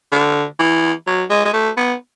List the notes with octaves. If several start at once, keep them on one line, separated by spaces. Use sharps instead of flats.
D3
E3
F#3
G#3
G#3
A3
B3